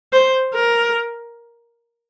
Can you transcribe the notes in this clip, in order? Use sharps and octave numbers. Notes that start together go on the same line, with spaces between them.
C5
A#4